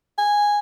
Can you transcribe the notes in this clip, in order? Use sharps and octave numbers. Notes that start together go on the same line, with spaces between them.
G#5